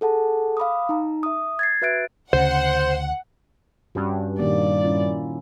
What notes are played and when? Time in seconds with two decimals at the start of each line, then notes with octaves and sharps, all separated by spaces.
0.01 G#4 A4 F#5 A5
0.57 F5 B5 D6 D#6
0.89 D#4 A#5
1.23 E5 D#6
1.59 G#6 A6 C7
1.82 F#4 B4 E5 F#6 A6 D7
2.33 D2 C#3 C5 F#5
3.95 G2 G3 C#4 F#4
4.39 A#2 D#3 A#3 D5
4.84 C#4 E4 F4